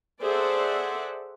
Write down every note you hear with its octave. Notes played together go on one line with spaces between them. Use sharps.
G#4 A4 C5 D5 E5 F#5